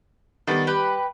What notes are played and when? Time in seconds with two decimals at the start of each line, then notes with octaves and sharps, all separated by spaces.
0.47 D#3 G3 B3 A4 D5
0.67 G3 G4 B4 B5